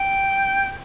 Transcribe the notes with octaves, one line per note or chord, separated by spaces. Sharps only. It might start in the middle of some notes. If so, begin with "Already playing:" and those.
Already playing: G5